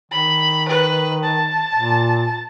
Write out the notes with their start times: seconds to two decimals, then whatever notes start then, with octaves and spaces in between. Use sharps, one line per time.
0.12 D#3 B5
0.68 B4
1.24 A5
1.75 A#2